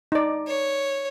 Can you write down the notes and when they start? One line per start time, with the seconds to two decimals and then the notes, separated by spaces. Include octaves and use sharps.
0.12 D#4 D5
0.47 C#5